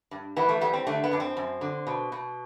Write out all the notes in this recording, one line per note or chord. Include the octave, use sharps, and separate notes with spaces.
G2
E3 B3
A3
G3 B3
C4
D3 A3
B3
F#2 D4
C4
F#2
D3
B2
B2